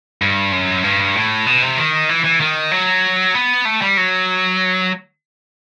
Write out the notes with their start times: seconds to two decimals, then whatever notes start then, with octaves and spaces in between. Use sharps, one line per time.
0.22 G2
0.52 F#2
0.84 G2
1.15 A2
1.46 B2
1.62 C3
1.78 D#3
2.09 E3
2.24 E3
2.41 D#3
2.71 F#3
3.35 B3
3.65 A3
3.81 G3
3.97 F#3